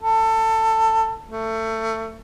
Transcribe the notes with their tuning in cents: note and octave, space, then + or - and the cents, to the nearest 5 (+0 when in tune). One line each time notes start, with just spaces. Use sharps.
A4 +20
A3 +25